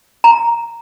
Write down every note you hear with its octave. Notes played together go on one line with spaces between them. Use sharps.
A#5